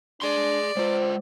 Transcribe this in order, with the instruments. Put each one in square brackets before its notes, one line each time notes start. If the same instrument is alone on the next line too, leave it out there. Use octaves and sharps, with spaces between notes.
[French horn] D4 [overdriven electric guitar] G#4 C6 [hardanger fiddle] D5
[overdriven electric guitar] G#3 F4 [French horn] C5